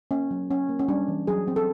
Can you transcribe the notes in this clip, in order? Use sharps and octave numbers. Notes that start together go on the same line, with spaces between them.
A#3 C#4
F#3
C#4
A#3
C#4
G3 D4
E3
F#3 G#4
C4
A4